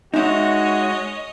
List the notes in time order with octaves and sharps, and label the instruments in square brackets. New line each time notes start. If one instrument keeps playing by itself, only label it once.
[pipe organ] G#3 [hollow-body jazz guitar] D#4 E5 [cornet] F#4 [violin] C#5 D#5